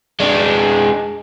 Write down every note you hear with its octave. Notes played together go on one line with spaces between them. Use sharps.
G#3 D4